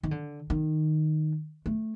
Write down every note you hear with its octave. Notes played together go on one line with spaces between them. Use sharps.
D#3
D3
D#3
A3